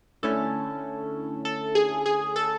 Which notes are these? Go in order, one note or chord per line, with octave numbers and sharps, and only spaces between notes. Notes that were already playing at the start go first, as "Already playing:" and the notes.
D3 A3 C#4 E4 A4
A4
G#4
G#4
A4